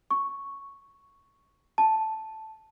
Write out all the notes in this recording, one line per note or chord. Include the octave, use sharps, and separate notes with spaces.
C#6
A5